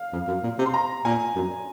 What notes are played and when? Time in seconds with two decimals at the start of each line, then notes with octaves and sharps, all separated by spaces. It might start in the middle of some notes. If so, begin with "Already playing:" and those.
Already playing: F5
0.13 F2
0.28 F#2
0.43 A#2
0.59 C3
0.66 C6
0.74 A#5
1.05 A#2 G#5
1.36 F#2